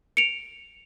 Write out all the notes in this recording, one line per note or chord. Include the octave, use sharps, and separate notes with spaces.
C#7 D7 F7